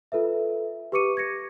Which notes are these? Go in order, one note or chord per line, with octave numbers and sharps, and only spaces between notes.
F4 A4 B4 E5
G4 B4 C#6 D6 C#7 D#7
G#6 A#6 C#7